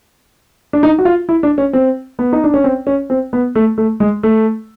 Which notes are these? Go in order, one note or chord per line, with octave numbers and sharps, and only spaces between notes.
D4
D#4
F#4
F4
E4
D4
C#4
C4
B3
D#4
D4
C#4
C4
C#4
C4
B3
A3
A3
G#3
A3